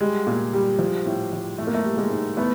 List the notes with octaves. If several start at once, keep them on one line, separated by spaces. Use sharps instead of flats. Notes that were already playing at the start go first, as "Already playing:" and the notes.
G3 G#3
A#2
G3
F3
A2
F3
E3 A3
A#3
A3
G3
G#3 A#3
G#2
E3 A3 B3